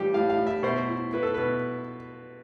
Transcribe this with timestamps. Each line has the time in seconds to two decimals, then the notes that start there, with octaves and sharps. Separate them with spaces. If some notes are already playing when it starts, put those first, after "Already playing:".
Already playing: A2 E3 G3 F4 G4
0.14 A2 F5
0.30 F5
0.38 A2
0.47 E5
0.63 B2 C5
0.88 E4
1.13 E4 B4
1.23 A4
1.34 B2 B4